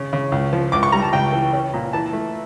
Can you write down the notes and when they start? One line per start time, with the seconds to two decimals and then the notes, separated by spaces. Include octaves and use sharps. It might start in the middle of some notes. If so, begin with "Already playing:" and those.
Already playing: C#3
0.13 C#3
0.32 C#2
0.53 F3
0.72 C#2 D6
0.83 C#6
0.92 G3 A#5
1.02 A5
1.13 C#2 G5
1.32 E3
1.53 C#4
1.74 A#2
1.93 E3 A5
2.13 A3